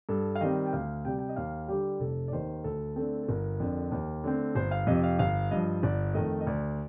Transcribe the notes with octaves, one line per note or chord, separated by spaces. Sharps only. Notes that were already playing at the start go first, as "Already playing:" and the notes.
G2 A4
F5
D#3 G3 C4 D#5
G5
D2 F5
C3 G3 G5
G5
D#5
D#2 F5
D3 G3 G4
F1 A4
D5
D#2 D#3 C5
D2 A4
D3 A3 C4 A4
A4
G1 A#4
F2 D3
D#2
D3 A3 C4
G1 C5
F5
F2 C3 F3 D#5
F5
G1 F5
G2 F3 D#5
G1 D5
F2 D#3 A3 D#5
D#5
D2 D5